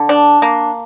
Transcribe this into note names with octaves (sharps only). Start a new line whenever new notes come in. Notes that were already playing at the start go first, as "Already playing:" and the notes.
Already playing: D3
D4
A#3